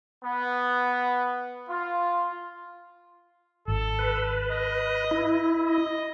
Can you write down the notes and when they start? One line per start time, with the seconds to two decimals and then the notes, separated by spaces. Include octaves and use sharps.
0.24 B3
1.70 F4
3.68 G#1 A4
3.99 B4
4.51 D#5
5.11 E4
5.67 D#5